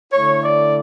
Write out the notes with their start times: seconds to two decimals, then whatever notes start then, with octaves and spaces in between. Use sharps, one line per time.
0.13 D3 A3 E4 C#5
0.43 D5